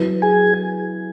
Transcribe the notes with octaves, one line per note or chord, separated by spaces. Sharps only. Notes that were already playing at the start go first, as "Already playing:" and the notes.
Already playing: F#3 E4 B4
G#4 G#5